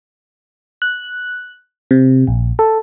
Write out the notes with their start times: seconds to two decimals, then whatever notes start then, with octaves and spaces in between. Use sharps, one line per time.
0.82 F#6
1.91 C3
2.27 A#1
2.59 A4